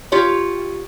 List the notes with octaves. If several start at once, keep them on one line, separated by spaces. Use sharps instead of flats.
F4 G4 C#5